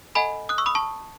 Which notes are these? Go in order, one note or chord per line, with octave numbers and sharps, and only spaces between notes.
A4 D#5 F#5 G#5 B5
D#6 F#6
C#6 E6
B5 D#6
A5 C#6